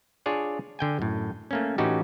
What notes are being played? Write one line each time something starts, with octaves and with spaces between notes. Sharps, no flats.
D4 F4 G#4 C#5 D5
D3 G5 G#5
F#2 A2
A3 A#3 C#4
A2 E3 C#4 D#4 F#4 G4